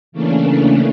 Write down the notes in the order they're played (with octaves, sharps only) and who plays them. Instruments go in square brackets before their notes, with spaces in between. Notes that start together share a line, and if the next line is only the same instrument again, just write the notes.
[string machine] C#3 E3 A3 A#3 C#4 D4